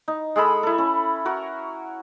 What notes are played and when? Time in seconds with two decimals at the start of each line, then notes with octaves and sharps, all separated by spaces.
0.08 D#4
0.36 G#3 G#4 A4 B5
0.63 E4 A4
0.78 C#4
1.25 F#4 A#4 C#6